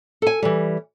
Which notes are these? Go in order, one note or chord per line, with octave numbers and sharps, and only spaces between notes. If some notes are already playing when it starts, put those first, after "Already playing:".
A4 G#5
E3 G3